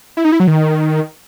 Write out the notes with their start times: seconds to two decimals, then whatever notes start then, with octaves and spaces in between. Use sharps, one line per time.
0.17 E4
0.25 D#4
0.32 E4
0.40 F#3
0.47 D#3